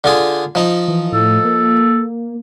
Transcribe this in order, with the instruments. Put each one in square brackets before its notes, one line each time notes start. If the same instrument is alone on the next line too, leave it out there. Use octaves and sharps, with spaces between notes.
[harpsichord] D3 F4 G#4
F3 D#4
[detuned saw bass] E3
[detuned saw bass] A2 [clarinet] A4
[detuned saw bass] A#3